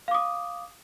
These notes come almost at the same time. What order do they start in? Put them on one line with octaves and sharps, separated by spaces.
F5 D6 D#6